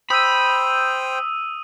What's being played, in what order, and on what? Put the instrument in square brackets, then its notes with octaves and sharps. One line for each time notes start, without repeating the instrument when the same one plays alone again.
[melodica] C5 G5 [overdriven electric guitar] B5 [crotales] D#6 E6 D#7